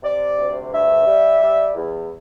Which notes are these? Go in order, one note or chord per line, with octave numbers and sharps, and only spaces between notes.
C3 D5
D2
G2 E5
G3
G3
E2